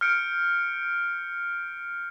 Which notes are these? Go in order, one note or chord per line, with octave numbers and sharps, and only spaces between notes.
F6 G6 C#7 D7